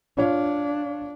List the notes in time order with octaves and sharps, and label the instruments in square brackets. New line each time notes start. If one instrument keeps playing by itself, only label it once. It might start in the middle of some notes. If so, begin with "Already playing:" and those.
[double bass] D4 [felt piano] F4 C#5 F5